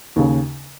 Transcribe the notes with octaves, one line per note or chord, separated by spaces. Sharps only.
D#2 C#3